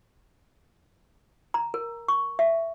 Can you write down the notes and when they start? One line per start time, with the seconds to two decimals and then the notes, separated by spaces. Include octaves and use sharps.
1.54 A#5
1.74 A#4
2.08 C#6
2.39 E5